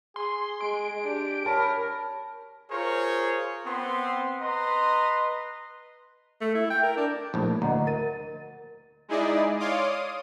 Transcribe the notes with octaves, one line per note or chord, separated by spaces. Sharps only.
G#4 C6
G#3 G#4 D7
D4 G4
A#4 C#5 A5 B5
F4 G#4 A#4 C5 C#5
B3 C4 C6
B4 D#5 A#5 C6
A3
E4
G5
A#4
D4
A#1 A2
D2 D#5 F#5 A#5
A#4 A6 D#7
G#3 D#4 E4 G#4 D5 D#5
C#5 D5 F5 C6 D6 D#6
D#6